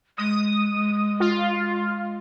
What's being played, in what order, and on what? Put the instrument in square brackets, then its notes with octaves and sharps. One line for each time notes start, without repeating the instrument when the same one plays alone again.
[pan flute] G#3 [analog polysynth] D#6
[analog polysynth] F4